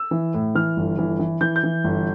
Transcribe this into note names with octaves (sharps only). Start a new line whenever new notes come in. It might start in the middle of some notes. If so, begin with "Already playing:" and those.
Already playing: E6
E3
A2
E3 F6
G1
E3
E3
E3 G6
G6
E3
G1